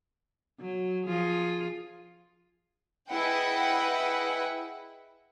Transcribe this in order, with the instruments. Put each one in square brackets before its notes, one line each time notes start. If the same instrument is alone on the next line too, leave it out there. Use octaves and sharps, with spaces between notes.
[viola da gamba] F#3
F3 F4 G#4
[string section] E4 G#4 B4 D#5 F#5 G5